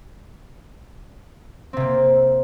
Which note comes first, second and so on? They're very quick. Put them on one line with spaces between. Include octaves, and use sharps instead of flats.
C4 C3 A#3